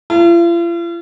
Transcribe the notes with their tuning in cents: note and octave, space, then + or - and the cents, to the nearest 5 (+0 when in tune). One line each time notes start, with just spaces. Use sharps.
F4 -45